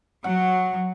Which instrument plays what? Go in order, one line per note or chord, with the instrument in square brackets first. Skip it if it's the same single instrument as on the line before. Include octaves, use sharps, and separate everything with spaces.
[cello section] F#3 [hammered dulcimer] F#5